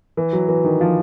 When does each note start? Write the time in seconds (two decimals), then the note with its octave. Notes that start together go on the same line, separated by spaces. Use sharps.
0.17 E3
0.33 F#3
0.48 E3
0.64 D#3
0.81 F3